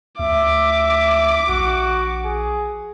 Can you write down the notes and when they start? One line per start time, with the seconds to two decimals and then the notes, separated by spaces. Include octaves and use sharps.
0.19 D2 E5 D6
1.49 A#1 F#4
2.25 G#4